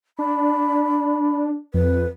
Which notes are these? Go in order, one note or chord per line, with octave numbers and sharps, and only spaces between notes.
D4 B5
F2 B4